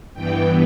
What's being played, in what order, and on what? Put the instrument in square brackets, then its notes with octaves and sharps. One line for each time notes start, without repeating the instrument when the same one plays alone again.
[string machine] G2 E3 B3 G5